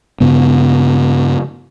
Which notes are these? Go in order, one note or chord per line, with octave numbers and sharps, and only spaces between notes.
G2 C#3 B3